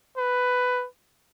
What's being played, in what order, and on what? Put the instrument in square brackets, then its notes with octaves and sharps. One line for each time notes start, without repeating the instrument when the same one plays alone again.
[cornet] B4